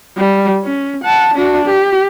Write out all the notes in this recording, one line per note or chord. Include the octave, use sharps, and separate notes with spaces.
G3
C#4
F#5 A5
D4 F#4
G4